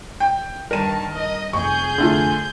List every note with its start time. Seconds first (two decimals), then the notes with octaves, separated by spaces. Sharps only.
0.20 G5
0.71 G2 D#3 A#4 A5 D#7
1.12 D#5
1.53 F1 F2 G#4 C#6 G6
1.98 D3 A3 F4